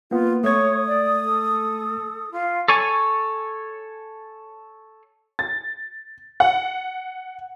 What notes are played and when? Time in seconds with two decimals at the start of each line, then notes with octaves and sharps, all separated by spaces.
0.11 A#3 B3 F4
0.44 A3 C#5 D#6 G#6
0.86 D5
1.24 A4
2.31 F4
2.68 A4 C#5 G#5
5.39 A6
6.40 F#5